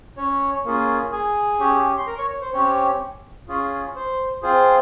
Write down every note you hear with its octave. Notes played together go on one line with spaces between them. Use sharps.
C#4 C#5
A#3 C#4 F4 G#4
G#4 G#5
C#4 G4
C6
A#4 A#5
C#5 C#6
C5
C4 C#4 G4 C#5
C#4 F4 G#4
C5
C4 F4 G#4 C5